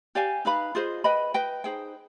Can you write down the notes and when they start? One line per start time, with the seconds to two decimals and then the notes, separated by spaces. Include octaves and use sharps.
0.15 G4 D5 F5 G#5
0.45 D#4 B4 F5 B5
0.75 F4 G#4 C5 D#5
1.04 B4 D#5 G5 B5
1.34 B4 D#5 G5
1.64 D#4 G#4 C5 G5